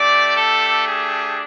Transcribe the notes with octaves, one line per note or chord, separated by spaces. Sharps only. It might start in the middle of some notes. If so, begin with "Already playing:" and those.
Already playing: A3 D4 G4 D5
A4
G#4